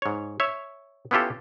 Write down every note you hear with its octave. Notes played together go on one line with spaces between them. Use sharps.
G#2 C#5
C#5 E5
B3 C#4 E4 F4 G4 A4